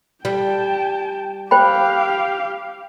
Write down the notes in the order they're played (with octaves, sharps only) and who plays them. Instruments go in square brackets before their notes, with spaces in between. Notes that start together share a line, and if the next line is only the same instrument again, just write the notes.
[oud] G3 [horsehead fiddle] G5 A5
[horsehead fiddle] G4 F5 [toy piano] C5 G5 B5